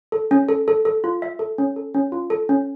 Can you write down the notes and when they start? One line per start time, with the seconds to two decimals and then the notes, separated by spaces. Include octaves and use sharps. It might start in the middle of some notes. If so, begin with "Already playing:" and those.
0.12 A4
0.31 C#4
0.49 A4
0.68 A4
0.85 A4
1.04 F4
1.22 E5
1.39 A4
1.58 C#4
1.76 A4
1.94 C#4
2.12 F4
2.30 A4
2.49 C#4